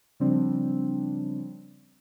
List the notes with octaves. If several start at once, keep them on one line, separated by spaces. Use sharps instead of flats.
C#3 F3 G3 C4 D4